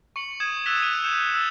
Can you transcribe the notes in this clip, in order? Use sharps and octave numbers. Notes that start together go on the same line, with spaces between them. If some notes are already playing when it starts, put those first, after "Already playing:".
C#6 C#7 F#7
D#6 G#6 E7
E6 F#6 A6 B6 F7 F#7
F#6 D#7 F7
G6 C#7 E7 F7
E6 F6 A6 F7